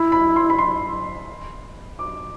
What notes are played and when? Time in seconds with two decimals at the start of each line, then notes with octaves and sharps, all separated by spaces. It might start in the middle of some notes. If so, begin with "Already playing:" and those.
Already playing: E4 B5
0.12 B5
0.36 C6
0.50 B5
0.59 C6
1.99 D6